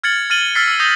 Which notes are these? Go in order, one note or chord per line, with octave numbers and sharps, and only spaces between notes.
F6 G#6 A6 C#7 F#7
F6 A6 D#7 F#7 G7
E6 F6 A6 B6 C7
E6
D#6 G6 A#6 G7